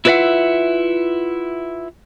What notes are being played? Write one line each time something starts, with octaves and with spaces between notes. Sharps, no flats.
E4 F4 B4 D5 E5 F#5